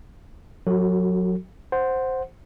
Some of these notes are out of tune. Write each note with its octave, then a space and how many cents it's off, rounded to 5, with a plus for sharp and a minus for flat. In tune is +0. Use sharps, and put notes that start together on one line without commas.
F#3 -20 F#4 +25 A4 +40
C5 +0 F#5 +0